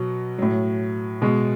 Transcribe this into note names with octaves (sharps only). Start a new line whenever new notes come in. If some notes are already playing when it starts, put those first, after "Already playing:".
Already playing: B2 F#3
A2 F#3
B2 G#3